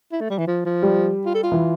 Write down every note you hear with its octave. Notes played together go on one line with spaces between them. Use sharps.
E4
A3
G3
E3
F3
F3
G3
F4
A4
F4
E3